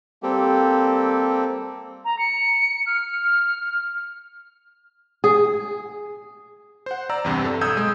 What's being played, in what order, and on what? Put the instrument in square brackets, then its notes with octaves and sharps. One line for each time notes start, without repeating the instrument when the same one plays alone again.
[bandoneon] G3 A#3 C4 G4 A4
[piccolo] A#5
C#7
F6
[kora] G#4
[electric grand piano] C5 F#5
D5 A#5 E6
E2 G2 C3
A4
B1 D#6 E6 G6 G#6
G#3